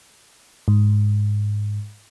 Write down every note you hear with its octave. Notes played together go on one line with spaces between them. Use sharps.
G#2